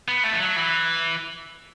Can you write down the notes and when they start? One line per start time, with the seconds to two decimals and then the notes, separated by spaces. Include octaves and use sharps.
0.08 B3
0.24 A3
0.33 E3
0.40 F#3
0.56 E3